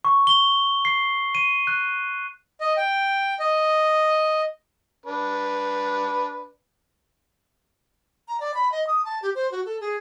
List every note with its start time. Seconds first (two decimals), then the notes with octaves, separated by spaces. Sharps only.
0.05 C#6
0.27 G7
0.85 C7
1.35 D#7
1.67 F#6
2.61 D#5
2.77 G5
3.40 D#5
5.06 D4 B4
8.28 A#5
8.40 D5
8.54 B5
8.72 D#5
8.87 D#6
9.05 A5
9.22 G4
9.35 C5
9.51 F#4
9.66 A4
9.80 G#4